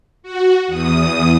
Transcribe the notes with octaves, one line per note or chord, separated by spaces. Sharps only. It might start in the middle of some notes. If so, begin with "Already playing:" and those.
F#4
E2 D#6